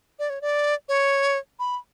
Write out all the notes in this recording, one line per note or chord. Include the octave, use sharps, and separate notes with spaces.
D5
C#5
D5
C#5
B5